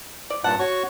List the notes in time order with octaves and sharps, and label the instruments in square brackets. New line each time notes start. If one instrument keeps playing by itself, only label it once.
[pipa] D5
[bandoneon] G2 A#2 A5 [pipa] F#5
[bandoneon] F#4 C#5 C#6